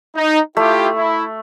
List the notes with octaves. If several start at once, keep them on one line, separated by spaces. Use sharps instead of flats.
D#4
A3 E4 F4 G4
E4